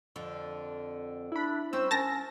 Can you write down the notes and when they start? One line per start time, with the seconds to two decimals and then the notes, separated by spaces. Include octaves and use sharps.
0.16 F2 D3
1.32 D4 E4 B5
1.73 C4 C#4 C5 E6
1.91 C#4 A#4 A5 A#6